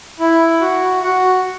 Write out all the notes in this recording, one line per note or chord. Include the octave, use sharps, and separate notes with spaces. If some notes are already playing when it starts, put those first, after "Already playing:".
E4
F#4
F#4